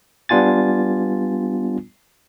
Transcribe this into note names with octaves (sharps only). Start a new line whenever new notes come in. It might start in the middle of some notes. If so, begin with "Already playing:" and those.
G3 B3 D4 F4 G#5 A6